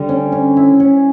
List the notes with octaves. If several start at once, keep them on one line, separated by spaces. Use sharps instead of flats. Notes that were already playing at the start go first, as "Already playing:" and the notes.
Already playing: D3 G3
C#4
C#4
E4
C#4